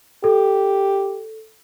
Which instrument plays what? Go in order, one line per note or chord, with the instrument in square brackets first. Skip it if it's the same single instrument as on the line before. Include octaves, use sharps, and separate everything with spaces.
[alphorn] G4 [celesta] A4